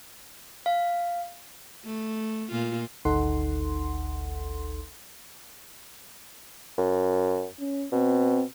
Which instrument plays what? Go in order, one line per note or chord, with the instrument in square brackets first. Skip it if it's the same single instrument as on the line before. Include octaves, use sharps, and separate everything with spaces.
[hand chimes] F5
[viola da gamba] A3
A#2 F4
[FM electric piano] G#1 D2 D#4 A4 F#5 C6
[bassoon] F#2
[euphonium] C#4
[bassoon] B2 [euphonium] C4